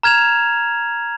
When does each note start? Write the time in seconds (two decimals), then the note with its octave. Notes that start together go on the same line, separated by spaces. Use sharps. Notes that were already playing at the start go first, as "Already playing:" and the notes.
0.03 A#5 F6 G#6 E7 F7